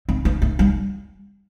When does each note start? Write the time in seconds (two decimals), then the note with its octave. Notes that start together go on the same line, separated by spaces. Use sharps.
0.09 C4
0.25 B3
0.42 A3
0.59 G3